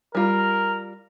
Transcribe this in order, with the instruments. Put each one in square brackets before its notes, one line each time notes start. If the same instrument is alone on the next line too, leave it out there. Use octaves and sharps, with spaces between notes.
[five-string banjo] G3 F4 [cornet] A#4